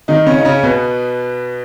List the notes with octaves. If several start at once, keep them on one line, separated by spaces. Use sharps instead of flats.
D#3 D#4
C#3 C#4
D#4
C#3 C#4
B2 B3